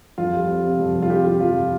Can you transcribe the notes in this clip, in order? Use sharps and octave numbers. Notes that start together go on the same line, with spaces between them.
F2 F4
G3
C4
C3
F2
G3
F4
C3 G4
G3 F4
F2 F4